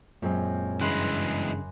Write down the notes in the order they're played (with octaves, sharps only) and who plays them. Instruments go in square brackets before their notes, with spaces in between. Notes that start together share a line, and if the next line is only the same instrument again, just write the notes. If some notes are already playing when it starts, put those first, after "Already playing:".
[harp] F#2 [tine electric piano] A#2 G#3 C4
[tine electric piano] G2 C#3 [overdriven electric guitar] E3 G#3 [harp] B5 C6 F#6